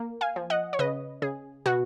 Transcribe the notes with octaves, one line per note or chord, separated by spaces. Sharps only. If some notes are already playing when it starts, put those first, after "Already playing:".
Already playing: A#3
F5 G#5
F3
D#5 F#5
C#5
C#3 B4 D#5
C#3 G#4
B2 F#4